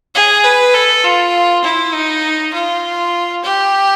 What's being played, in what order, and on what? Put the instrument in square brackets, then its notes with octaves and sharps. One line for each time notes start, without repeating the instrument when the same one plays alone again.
[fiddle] G#4
B4
A4
F4
E4
D#4
F4
G4